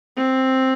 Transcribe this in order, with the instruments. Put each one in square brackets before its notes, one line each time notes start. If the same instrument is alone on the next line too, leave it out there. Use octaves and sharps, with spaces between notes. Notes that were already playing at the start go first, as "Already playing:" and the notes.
[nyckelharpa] C4